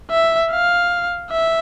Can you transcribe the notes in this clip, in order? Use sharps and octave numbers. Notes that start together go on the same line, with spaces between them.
E5
F5
E5